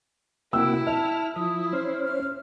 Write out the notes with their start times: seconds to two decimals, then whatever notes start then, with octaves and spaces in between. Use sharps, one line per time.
0.53 C3 A#3 E4 F#4 G5 E6
0.87 E5 A5 F6
1.36 F3 E4 D#6
1.73 C#4 C5 F6
2.05 F6